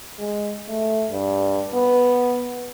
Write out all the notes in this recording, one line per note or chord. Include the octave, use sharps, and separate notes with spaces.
G#3
A3
G2
B3